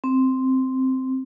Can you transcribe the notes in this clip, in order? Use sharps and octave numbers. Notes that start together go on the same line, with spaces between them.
C4